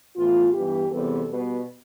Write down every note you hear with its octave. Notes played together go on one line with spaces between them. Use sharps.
A2 E3 B3 F4
G2 E3 B3 G4
E2 C3 G3 B3 A4
B2 G3 B3